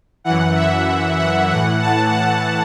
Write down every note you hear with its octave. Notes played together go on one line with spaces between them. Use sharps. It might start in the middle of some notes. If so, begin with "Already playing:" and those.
F#2 E3 F#5
E5
F#5
A2 E3 F#5
A5
F#5